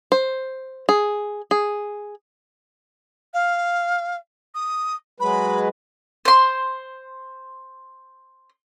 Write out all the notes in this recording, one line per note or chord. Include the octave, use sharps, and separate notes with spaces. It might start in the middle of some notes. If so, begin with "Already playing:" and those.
C5
G#4
G#4
F5
D#6
F#3 G#3 B4 B5
C5 C6